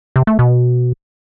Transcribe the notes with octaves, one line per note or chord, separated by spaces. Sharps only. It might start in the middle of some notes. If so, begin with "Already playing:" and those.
C3
A3
B2